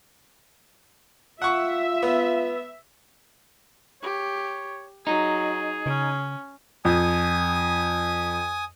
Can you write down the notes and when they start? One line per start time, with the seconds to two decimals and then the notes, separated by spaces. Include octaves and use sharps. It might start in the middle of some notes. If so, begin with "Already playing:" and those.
1.42 F4 E5 F#5 C#6
2.03 B3
4.02 G4 C#5
5.07 F#3 D#4 G#4
5.86 C#3 C#4
6.85 F2 G#5 D#6